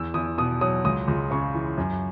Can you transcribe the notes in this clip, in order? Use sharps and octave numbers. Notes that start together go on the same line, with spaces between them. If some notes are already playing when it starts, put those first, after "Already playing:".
Already playing: E2 E6
E2 D#6
B2 D#6
F#3 D#6
C#2 D#6
C#2
C#3 C#6
E3
F#2